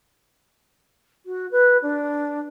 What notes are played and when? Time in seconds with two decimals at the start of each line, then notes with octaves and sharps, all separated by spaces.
1.26 F#4
1.51 B4
1.82 D4